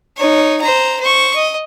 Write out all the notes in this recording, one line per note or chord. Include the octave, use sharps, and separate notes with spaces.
D#4 C#5
C5 A#5
C5 C#6
D#5